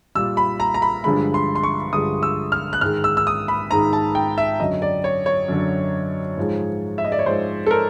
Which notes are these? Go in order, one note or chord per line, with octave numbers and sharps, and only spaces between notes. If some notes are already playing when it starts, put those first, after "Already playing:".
A#2 G3 E6
B5
A#5
A#5
B5
G2 D3 F3 G#3 B5
C6
C6
C#6
G2 D3 F3 G#3 D#6
E6
F6
F#6
G#2 D#3 G#3 F6
E6
E6
D#6
B5
G#2 D#3 G#3 A#5
A5
G5
E5
F#2 D3 F#3 D#5
D5
C#5
C#5
F#2 D3 F#3
G#2 F3 G#3
E5
D#5
D5
C#5
G#2 F3 G#3 C5
A4
A#4